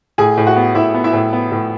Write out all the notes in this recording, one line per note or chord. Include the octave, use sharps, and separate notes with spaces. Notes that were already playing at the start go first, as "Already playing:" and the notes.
A2 G#4 G#5
A2
F#4 F#5
B3
A2 E4 E5
B3
E4 E5
A2
B3
A2